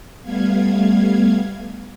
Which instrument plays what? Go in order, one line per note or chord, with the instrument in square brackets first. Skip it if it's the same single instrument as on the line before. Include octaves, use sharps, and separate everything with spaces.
[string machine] G3 A3 B3 F5 G#6